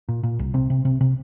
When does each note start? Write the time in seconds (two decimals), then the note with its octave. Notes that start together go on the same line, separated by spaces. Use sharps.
0.09 A#2
0.23 A#2
0.39 C2
0.54 C3 C4
0.70 C3
0.85 C3
1.01 C3